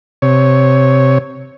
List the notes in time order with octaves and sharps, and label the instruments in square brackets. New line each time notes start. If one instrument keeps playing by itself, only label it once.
[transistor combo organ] C3 C#5